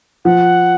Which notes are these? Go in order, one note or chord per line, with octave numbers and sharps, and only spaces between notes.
F3 F#5